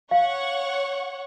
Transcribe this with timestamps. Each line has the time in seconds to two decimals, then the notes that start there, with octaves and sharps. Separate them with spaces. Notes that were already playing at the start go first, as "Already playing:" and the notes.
0.11 C#5 F5 F#5 C#6